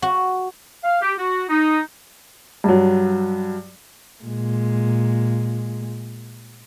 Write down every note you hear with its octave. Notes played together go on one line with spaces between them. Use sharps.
F#4
F5
G4
F#4
D#4
G2 F#3
A#2 G#3